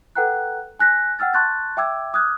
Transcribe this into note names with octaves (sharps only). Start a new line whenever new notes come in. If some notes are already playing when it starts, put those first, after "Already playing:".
A4 B4 F#5 G5 A#5 F#6
G#5 F#6 A#6 B6
F#5 G5 E6 F6 A6
A5 C6 C#6 F#6 G6 A6
E5 G5 D6 E6 G#6
D6 D#6 F6 F#6 G#6